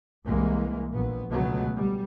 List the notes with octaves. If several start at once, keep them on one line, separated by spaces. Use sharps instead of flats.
C2 E3 G#3 A#3
A#1 B3
C#2 B2 D3 F#3 A3 B3
G3